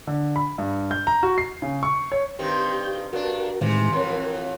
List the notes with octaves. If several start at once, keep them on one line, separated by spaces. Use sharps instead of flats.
D3
B5
G2
G6
A#5
F#4
C7
C#3
C#6
C#5
G2 D#3 C4 G4 G6
G2 D4 F#4 A#4
A2 C3 D#3 E3 G#3
F2 A2 E3 A#4